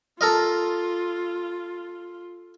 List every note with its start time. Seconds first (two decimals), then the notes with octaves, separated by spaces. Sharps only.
0.21 F4 A4 A#4 D#5